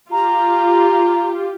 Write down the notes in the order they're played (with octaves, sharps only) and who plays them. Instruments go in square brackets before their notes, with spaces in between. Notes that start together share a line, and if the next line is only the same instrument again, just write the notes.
[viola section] F4 G4 [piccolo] A#5